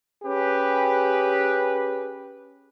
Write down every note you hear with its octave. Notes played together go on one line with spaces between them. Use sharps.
C#4 G4 G#4 B4